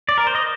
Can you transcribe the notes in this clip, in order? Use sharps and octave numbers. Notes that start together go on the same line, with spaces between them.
D5
A#4
C5
D#5